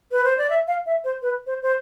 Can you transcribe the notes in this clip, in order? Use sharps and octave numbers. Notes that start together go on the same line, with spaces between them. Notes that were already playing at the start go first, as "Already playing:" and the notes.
B4
C5
D5
E5
F5
E5
C5
B4
C5
C5